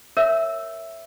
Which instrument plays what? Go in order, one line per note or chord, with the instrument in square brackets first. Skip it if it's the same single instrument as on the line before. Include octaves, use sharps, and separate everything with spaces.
[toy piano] A#4 C#5 E5 E6